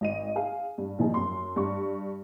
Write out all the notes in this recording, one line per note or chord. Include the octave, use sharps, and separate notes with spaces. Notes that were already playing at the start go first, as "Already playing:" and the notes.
G#1 D#5 D#7
G#4 F5
G2
A#1 D#3 F3 D#4 G#4
F#2 C6
G2 C#6